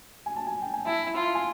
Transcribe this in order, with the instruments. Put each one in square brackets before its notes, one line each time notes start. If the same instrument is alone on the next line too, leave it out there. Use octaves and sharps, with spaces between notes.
[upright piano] G#5
A5
G#5
G5
G#5
[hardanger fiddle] E4 [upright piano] A5
[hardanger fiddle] F4
[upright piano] G#5